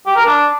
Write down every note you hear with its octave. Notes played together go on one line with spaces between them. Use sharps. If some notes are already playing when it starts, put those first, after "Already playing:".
G4
A#4
D4